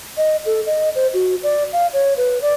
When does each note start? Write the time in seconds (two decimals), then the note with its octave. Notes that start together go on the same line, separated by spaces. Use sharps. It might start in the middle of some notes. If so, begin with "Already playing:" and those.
0.17 D#5
0.46 A4
0.66 D#5
0.95 C5
1.14 F#4
1.43 D5
1.73 F5
1.93 C#5
2.17 B4
2.42 D5